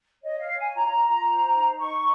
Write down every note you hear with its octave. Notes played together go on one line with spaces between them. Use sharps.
C#5 D#5
F5
C#5
G#5
F4 A#5
F4
C5
D#4
D#4 C#6